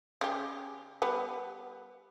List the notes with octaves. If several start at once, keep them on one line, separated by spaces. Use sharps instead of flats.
C#3 G4
G3 B3